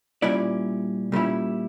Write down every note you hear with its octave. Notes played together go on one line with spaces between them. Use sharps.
A#2 G3 C#4 E4 D5
A#2 G3 C#4 E4